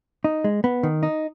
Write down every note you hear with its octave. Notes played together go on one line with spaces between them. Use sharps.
D#4
G#3
B3
D#3
D#4